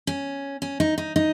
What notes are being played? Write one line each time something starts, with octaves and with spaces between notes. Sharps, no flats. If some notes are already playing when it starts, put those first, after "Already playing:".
C#4
C#4
D#4
D#4
D#4